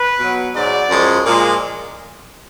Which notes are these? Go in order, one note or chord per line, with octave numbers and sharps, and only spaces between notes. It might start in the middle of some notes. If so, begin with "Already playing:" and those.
Already playing: B4
B2 F#3
G#2 F#3 D5
F#2 F3 G#3
A#2 F3 G#3